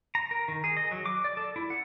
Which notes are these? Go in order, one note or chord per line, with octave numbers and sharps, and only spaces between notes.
A#5
A#4
D#3
G#4
D#5
F#3
D6
D5
A4
E4
F#5